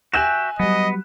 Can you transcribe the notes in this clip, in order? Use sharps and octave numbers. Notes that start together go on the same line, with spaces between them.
F#4 E5 G5 G#5 F#6 E7
F#3 G3 B3 D#5